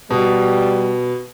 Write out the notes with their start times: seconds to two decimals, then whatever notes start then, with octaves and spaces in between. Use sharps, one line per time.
0.10 B2 G3